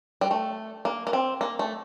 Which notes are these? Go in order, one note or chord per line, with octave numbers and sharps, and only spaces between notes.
G3
A3
A#3
A#3
C4
A#3
A3